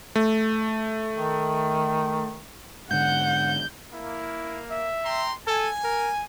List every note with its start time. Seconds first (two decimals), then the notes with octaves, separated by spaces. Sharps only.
0.16 A3
1.16 D#3
2.91 G#2 D3 F#5 G6
3.94 A#3 E4
4.70 E5
5.05 G5 A#5 C6
5.47 A4 G#5
5.84 A#4